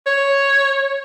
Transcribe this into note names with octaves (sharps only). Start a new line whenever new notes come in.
C#5